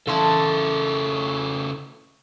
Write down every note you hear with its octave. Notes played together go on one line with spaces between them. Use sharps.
C#3 E4 A4 F5 A5 C6